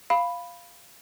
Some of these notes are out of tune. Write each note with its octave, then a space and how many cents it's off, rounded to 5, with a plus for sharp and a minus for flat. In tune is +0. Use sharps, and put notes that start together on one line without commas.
F5 +0 B5 +0